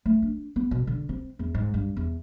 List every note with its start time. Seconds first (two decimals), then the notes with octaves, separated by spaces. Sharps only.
0.06 A3
0.22 D4
0.56 B3
0.71 B2
0.87 D3
1.09 C4
1.39 E2
1.55 G#2
1.74 G2
1.97 E2